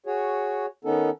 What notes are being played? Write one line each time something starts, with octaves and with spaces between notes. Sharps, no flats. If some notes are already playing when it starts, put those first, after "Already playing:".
F#4 G#4 C#5
D#3 B3 C#4 D#4 A4